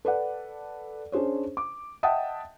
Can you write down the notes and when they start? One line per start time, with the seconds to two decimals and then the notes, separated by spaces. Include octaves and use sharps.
0.05 A4 B4 D5 F#5
1.12 C#4 D4 G#4 C5 C#5
1.57 D6
2.03 D#5 E5 F#5 G5 A5 D#6